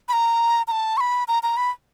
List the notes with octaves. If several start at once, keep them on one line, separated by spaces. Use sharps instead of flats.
B5
A#5
A#5
A5
C#6
B5
A#5
A#5
B5